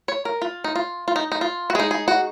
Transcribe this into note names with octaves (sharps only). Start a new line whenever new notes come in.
C#5
A#4
F4
D#4
F4
F4
D#4
D#4
F4
F#4
G#3 D#4 G#4
G#4
F#4